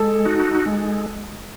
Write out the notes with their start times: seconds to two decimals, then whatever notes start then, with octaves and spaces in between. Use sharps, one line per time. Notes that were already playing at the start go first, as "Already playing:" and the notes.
Already playing: G#3 A4
0.25 D#4 F#4
0.66 G#3